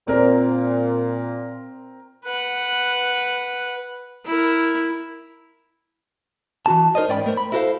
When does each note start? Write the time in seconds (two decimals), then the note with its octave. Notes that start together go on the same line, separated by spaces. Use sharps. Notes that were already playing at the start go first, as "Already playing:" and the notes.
0.08 A#2 C4 A#4
2.25 B4 F#5
4.25 E4 A#4
6.66 E3 F#4 A5
6.95 D#4 A#4 C5 D5 D#5
7.09 G#2 C#4 D5 G5 A#5 B5
7.26 A3 A#4 C5
7.37 B5
7.52 E4 F#4 A4 A#4 C5 F5